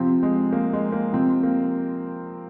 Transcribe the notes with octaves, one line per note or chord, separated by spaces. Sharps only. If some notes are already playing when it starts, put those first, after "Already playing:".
Already playing: C3 F3 C4
G#3
A#3
G#3
A#3
C3 F3 C4
A#3